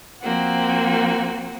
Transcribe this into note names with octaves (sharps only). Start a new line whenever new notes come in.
F3 A#3 C4 F#4